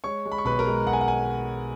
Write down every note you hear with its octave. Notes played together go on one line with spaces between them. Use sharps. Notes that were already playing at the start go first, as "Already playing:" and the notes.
G#3 C#5 C#6
G#3
B5
C#6
B1 B4 B5
A#4 A#5
G#3
B1 F#5
G#5
F#5
G#5